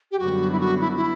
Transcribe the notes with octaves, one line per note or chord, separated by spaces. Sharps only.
G4
F#2 D3 G3 B3 F#4
E4
F#4
E4
E4